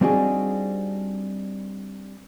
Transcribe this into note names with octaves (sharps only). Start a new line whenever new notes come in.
G3 C4 D4 D#4 F#4 G#4